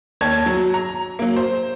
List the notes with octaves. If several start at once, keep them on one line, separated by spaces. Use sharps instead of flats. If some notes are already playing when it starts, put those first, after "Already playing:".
D#2 C#5 A5 G#6
F#3
A#5
F#3 A#3
C5